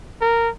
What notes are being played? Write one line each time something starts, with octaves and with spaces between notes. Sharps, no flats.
A#4